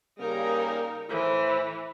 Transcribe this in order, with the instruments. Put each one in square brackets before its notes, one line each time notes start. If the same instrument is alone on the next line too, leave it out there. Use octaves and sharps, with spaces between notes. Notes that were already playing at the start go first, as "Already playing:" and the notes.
[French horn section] C#3 G3 A#3 [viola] D#4 A#4
[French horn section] A2 E4 C5 [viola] E3